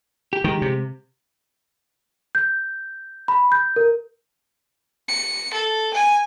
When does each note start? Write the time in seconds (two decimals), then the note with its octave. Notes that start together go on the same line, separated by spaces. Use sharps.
0.33 G4
0.44 D#3 G#3 G4
0.62 C3
2.35 G6
3.28 B5
3.52 G6
3.76 A#4
5.08 C#7
5.53 A4
5.93 G#5